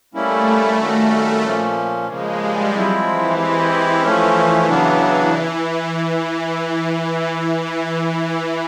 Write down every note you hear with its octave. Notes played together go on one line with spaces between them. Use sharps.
G3 A3 A#3 C#4 E4
D#3 G3 A#3 C#4 F#4
A#2 F3 A#3 C#4
C#3 F3 G#3 A#3
G3
F3 F#3 G#3 C4 E4
E3
G#3 C4 E4 G4
F3 A3 C#4
C#3 F#3 B3 D4